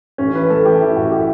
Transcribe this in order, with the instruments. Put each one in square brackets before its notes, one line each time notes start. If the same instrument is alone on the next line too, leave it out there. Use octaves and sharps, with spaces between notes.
[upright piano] A1 C#4
E3 B4
A2 A4
E3 G4
E3 E4
A1 F#4
G4